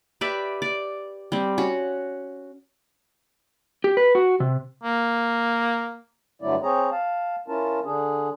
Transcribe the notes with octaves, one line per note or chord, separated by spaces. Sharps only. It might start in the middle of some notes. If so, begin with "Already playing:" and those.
G4 B4 D5 E5
D5
G3 C4
C#4 F#4
G4
B4
F#4
C3
A#3
G2 D3 F#3 A3 E4 D5
C4 G#4 C#5 A#5
F5 A5
C#4 E4 F4 A#4 A5
D3 D4 G#4